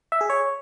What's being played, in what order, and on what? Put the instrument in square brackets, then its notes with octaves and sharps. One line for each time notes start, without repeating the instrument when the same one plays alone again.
[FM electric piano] E5
G#4
C#5